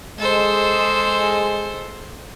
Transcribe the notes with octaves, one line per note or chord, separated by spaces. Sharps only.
G#3 A4 C5